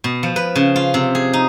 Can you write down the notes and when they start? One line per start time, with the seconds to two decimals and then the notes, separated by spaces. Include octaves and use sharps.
0.04 B2
0.23 F3
0.36 B4
0.55 C#3
0.76 F4
0.94 C3
1.15 G#4
1.33 D#4